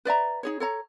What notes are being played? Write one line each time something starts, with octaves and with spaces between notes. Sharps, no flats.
B4 D5 E5 A#5
D#4 G#4 C#5
A4 C#5 A#5